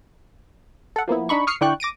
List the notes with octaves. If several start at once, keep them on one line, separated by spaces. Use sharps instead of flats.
A4 F#5
F3 A#3 B3 E4
D4 D#4 B5 C#6
C#6 D#6 F6 C7 C#7
D3 E4 D5 G5 C#6 F#6
D6 A#6 D7 D#7